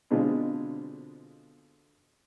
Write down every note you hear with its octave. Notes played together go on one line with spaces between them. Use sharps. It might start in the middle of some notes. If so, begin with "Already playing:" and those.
B2 D3 G#3 C4 D4 F4